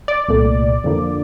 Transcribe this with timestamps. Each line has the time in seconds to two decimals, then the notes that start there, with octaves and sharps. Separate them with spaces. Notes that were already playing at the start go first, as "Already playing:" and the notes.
0.08 D5
0.28 C2 A#2 A3
0.84 F2 D3 F3 A#3